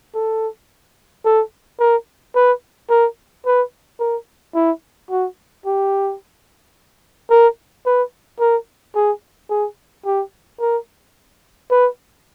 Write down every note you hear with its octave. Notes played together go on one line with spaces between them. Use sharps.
A4
A4
A#4
B4
A#4
B4
A#4
E4
F#4
G4
A#4
B4
A#4
G#4
G#4
G4
A#4
B4